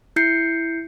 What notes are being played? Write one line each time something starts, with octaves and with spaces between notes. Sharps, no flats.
E4 G6 C7 C#7